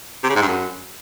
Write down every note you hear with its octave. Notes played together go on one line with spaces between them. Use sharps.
C3
C#3
G#2
G2
F#2